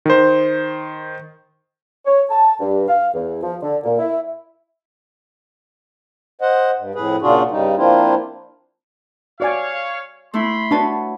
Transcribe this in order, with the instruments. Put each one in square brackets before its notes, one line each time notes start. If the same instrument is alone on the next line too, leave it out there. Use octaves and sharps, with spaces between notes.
[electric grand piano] D#3 C5
[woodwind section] C#5
A5
G2
F5
E2
F3
D3
A#2
E4
[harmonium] C5 D#5 F#5
G2
F2 A2 G#4 B4
A#2 C#3 D4 F4 F#4 G#4
G2 C#3 G3 D#4
F3 A#3 C4 D4 E4 F4
[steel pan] F#4 D5 G#5 [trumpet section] C#5 F5
[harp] A3 E4 [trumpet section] B5 C6
[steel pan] D4 A5 [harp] F#4 B4 C#5